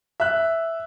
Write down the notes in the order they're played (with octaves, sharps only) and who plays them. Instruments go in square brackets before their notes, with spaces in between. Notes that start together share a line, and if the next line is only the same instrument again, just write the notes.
[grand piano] E5 F#6